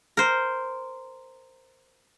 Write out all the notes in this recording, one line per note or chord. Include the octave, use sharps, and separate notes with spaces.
A#4 C5